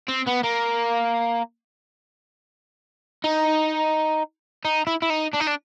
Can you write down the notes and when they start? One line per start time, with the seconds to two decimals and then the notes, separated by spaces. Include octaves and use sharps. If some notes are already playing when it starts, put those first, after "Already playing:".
0.08 C4
0.27 B3
0.43 A#3
3.24 D#4
4.65 D#4
4.87 E4
5.02 E4
5.10 D#4
5.34 D4
5.41 D#4
5.48 D4